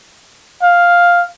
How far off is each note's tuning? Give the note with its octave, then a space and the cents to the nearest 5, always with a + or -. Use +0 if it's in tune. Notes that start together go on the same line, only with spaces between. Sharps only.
F5 +5